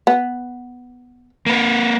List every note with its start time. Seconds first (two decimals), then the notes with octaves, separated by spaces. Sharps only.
0.07 B3
1.46 A#3 B4